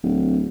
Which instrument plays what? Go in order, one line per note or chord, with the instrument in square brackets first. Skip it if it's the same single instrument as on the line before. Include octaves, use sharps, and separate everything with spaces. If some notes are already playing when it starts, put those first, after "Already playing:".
[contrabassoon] D1